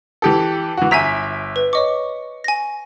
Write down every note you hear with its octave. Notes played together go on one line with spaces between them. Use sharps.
E3 G4 A4
E3 F#4
G1 E5 G#5 A#5 B6
B4
C#5 D#5 C#6 D6
G#5 A#6